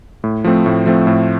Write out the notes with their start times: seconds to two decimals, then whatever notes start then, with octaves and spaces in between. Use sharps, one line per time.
0.24 A2
0.44 F3 A3 C4
0.66 A2
0.86 F3 A3 C4
1.07 A2